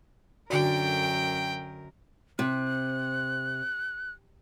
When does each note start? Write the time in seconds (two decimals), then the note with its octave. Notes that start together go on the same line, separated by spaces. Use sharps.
0.50 F#2 D3 F#4 A#4 D5 G5
2.39 C3 F#6